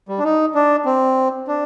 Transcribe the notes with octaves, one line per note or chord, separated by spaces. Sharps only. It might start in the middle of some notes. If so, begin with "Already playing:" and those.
G3
D4
D#4
D4
C4
D4